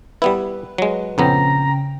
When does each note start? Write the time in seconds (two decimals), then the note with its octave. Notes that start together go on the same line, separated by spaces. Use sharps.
0.22 G3 B3 E4 B4
0.78 F#3 G#3
1.18 A#1 F2 C#3 B3 C#4 G5 A#5